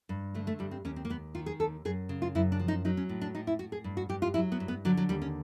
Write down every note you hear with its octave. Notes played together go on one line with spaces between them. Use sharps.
G2
D3 A3
A3
G2 G3
C4
D#2 C#4
C4
A#3
D#2 B3
D#3 F4
G#4
D#2 A4
F#2 G#4
C#3
F4
F#2 E4
D4
F3
D#4
F#3 D#4
C#4
A2
D4
A2 D#4
E4
A2 F#4
G#4
G2
F#4
G2 G4
F4
F#3 E4
B3
G2
B3
D3 F#3
F#3
D#2 G3
C#4